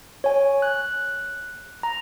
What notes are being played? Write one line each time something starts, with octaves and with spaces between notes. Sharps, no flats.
C#5 G#5
F#6
A#5